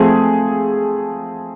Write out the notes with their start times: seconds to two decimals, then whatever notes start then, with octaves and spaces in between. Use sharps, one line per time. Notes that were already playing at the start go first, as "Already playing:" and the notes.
Already playing: F3 A3 C4 G#4